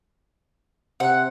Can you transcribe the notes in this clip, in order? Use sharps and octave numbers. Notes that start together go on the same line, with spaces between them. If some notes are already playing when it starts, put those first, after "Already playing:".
C3 F#5